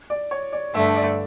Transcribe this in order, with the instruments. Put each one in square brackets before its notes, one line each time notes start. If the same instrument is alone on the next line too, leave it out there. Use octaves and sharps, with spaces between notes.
[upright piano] D5
C#5
D5
[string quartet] G2 D3 A3 D4 [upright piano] E5
[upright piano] D5